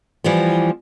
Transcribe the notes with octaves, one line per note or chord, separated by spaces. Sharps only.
E3 F3 G3 B3